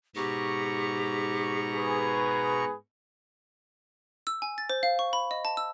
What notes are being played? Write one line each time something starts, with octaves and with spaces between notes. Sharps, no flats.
G#2 B2 G4 A#5 C#6
G#4 B4
E6
G#5
A6
C5
F5
C#6
B5
D#5
A5
E6